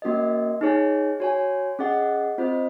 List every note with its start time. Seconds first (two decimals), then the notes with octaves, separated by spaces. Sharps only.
0.02 A#3 C#4 F#4 A#4 D#5
0.61 D#4 G#4 C#5 G#5
1.20 F#4 C#5 G#5
1.79 C#4 G#4 D#5 F#5
2.38 C4 F4 C5 D#5